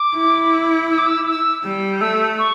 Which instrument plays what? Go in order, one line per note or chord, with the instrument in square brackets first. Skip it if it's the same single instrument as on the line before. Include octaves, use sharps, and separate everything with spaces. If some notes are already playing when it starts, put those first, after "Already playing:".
Already playing: [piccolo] D6
[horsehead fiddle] E4
[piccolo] E6
D6
E6
E6
[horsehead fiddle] G3
[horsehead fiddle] A3 [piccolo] E6
[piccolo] C#6